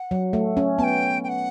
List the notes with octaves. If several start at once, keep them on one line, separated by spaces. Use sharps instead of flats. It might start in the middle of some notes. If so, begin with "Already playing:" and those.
Already playing: F#5
F#3
A3
C#4
B3 G5 A5
G5
F#5